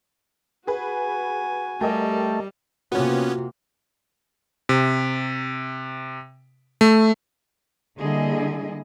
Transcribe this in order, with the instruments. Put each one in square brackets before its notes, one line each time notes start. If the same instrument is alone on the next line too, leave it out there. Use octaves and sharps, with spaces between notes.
[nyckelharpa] F#4 G#5 [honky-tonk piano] G#4 B4
[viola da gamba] G3 [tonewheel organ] A3 [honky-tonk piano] G4 A#4 D#5
[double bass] C3 A#3 [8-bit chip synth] B3 C#4 [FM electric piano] F4 F#4
[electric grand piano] C3
A3
[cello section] D3 G3 A#3 E4 G#4 D#5